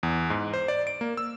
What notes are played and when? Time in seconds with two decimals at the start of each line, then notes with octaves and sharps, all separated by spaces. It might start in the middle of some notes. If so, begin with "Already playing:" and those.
0.03 E2
0.30 G#2
0.53 C5
0.68 D5
0.87 D7
1.01 A#3
1.17 E6